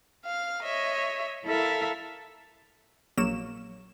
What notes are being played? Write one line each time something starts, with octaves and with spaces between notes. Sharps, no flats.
F5 F6
C#5 D#5 E5
E4 A4 A#4 E5 F5
A#1 F#3 A#3 E7